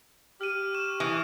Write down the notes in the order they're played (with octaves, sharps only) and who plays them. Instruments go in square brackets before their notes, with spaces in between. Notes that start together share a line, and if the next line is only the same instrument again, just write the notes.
[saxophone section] G4 [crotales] F6 D#7
[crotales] C#6 F6 E7
[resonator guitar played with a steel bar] E3 [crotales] D#6 D#7